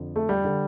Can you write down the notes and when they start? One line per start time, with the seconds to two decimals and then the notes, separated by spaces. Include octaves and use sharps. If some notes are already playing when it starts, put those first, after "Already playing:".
Already playing: F2 D3
0.16 A3
0.29 G3
0.44 D3